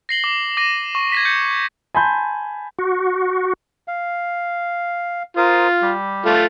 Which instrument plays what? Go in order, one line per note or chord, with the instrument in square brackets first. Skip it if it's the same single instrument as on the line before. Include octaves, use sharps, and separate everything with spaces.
[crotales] A#6 C7 F#7 G7
D6
D6 A#6 D#7
C#6
G#6 A#6 B6
G6 C#7
[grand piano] G#5 A5 B5 C6 G6
[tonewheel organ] F#4
[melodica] F5
[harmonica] F4 [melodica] A#4 C5 D#6
[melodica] G3 G4
[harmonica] A3 F4